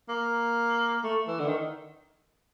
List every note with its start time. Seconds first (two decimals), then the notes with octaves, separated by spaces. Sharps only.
0.09 A#3
1.04 A3
1.27 E3
1.40 D3
1.48 D#3